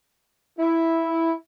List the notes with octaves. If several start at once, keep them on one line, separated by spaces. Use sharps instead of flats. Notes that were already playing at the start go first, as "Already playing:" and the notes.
E4